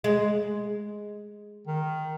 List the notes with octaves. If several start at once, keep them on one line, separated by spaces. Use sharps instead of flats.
G#3
D#3